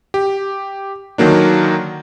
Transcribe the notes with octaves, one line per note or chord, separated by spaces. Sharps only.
G4
D3 D#3 F#3 A#3 D4